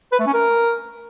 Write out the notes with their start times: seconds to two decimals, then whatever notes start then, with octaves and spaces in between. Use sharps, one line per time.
0.12 B4
0.19 A3
0.26 C#4
0.33 A#4